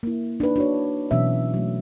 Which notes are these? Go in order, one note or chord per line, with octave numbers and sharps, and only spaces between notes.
A#3 E4
D4 D#4 B4
D4 F#4 C#5
B2 E3 F#3 B3 C#4 E5
F#3 A3